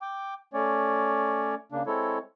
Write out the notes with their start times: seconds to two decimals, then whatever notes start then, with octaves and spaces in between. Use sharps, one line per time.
0.02 G5 D6
0.53 A3 C#4 C#5 D5
1.72 C#3 A#3 D4
1.86 G#3 C4 E4 A4 C#5